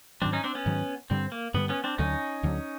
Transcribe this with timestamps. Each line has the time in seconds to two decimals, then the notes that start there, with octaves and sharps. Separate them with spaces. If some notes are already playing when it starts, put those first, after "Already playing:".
0.22 G#2 D#3 F#3 C4 D4
0.33 C#4 D#4
0.44 C4 D4
0.55 B3 C#4
0.66 G#2 D#3 F#3
1.10 G2 D3 G3 C4
1.32 A#3
1.54 G2 D3 G3 B3
1.69 B3 C#4
1.84 C4 D4
1.98 D2 D3 F#3 C#4 D#4
2.43 D2 D3 F#3